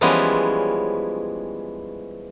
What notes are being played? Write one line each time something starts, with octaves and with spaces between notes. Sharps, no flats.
E3 F3 G3 G#3 B3 C#4